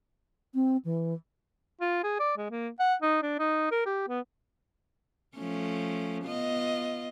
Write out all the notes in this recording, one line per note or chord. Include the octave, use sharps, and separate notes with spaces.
C4
E3
F4
G#4
D5
G#3
A#3
F#5
D#4
D4
D#4
A#4
G4
B3
F3 A3 C#4
B3 F4 D#5